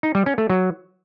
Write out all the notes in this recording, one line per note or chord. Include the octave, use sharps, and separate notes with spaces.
D#4
G3
C#4
A3
F#3